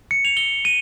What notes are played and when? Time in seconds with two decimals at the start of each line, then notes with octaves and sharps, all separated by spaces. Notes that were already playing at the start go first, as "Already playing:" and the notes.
0.11 C#7
0.25 F7
0.37 G7
0.65 D#7